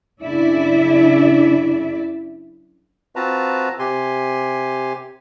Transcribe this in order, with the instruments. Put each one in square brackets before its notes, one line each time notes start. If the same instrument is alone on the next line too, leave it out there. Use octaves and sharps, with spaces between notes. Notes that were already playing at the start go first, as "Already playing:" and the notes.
[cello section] F#2 C#3 D4 E4 D5 E5
[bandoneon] C4 F4 F#4 B4 A5 A#5
C3 G4 G#5 C6